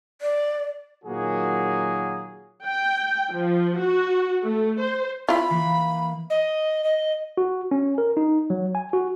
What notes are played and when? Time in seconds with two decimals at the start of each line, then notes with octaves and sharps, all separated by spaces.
0.21 D5
1.05 A#2 D#3 F#3 A#3 F#4 G#4
2.65 G5
3.31 F3
3.79 F#4
4.43 A3
4.79 C5
5.29 E4 F4 B5
5.50 E3 A#3
6.30 D#5
6.84 D#5
7.37 F#4
7.71 C#4
7.98 A#4
8.17 D#4
8.50 F#3
8.75 G#5
8.93 F#4